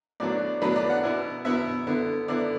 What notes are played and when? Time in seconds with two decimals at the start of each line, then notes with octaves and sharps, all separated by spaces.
0.20 A2 F#3 B3 D4 D5
0.62 A2 F#3 B3 D4 B4
0.76 D5
0.90 F#5
1.03 B2 B3 E4
1.45 B2 B3 E4 E5
1.87 D3 B3 E4
2.28 D3 B3 E4 D5